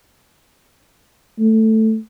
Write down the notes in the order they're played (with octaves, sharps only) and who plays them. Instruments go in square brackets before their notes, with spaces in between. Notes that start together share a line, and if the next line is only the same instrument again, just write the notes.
[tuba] A3